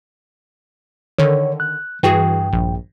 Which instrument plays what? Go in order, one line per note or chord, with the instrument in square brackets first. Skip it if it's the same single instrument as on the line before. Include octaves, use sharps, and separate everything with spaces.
[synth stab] D3 D#3 [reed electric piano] C#5
[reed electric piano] F#6
[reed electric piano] G2 G5 [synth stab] E3 F#4 G#4
[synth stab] A#1